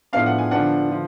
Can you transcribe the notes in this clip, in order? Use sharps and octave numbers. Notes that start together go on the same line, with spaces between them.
A2 F3 B3 D4 F5
F#5
G#5
D3 F3 B3 D4 F#5
D3 F3